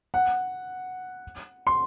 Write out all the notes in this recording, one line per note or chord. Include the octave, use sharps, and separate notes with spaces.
F#5
C6